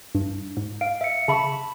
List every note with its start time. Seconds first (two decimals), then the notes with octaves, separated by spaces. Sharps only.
0.15 G2
0.57 G#2
0.81 F5 D7
1.01 E5 C#7
1.28 C#3 E5 A5 B5 C#6